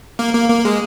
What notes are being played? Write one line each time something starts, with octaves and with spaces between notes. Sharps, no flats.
A#3
A#3
A#3
G#3